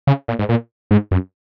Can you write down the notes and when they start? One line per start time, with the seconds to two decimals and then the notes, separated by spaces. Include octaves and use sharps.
0.07 C#3
0.28 A#2
0.39 G#2
0.49 A#2
0.91 G#2
1.11 F#2